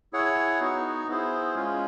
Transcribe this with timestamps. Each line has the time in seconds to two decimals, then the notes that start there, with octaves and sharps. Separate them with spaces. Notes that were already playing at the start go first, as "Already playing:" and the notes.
0.13 E4 G#4 C#5 F#5
0.60 B3 D#4 F#4
1.08 B3 E4 G#4 C5
1.55 G#3 C#4 F4